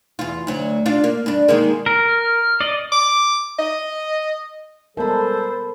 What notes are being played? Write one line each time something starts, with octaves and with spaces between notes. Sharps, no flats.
E2 F4
D2 F#3
D4 F4
A#3
G2 D4
D#3 G#3 A#3
A#4
F6
F6
D5 D#5
D6
D#5
G3 G#3 B3 A4 A#4 C5 A5 B5